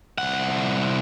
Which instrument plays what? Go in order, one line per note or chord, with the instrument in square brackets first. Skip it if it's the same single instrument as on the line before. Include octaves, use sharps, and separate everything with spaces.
[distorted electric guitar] C2 F#5